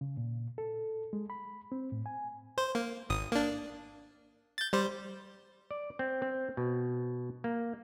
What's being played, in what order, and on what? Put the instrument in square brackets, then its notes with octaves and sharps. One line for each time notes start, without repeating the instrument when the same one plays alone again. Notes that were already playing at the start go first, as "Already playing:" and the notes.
[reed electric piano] C#3
A#2
A4
G#3
B5
C4
A2
G#5
[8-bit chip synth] C5
A#3
G#1 D#6
A#3 D4
G6 A6
G3 C5
[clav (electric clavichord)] D5
C4
C4
B2
A#3